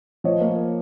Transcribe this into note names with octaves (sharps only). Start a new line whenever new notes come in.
F3 C#5 D#5
A#3